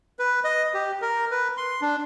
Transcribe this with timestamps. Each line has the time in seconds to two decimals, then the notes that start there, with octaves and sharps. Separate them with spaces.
0.19 B4
0.44 D#5
0.74 G4
1.02 A#4
1.31 B4
1.57 C6
1.81 D4